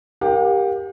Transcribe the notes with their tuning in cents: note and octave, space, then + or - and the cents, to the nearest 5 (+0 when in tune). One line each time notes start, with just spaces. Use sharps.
G4 +5 A#4 +0 F5 +45